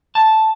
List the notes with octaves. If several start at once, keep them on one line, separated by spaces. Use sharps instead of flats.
A5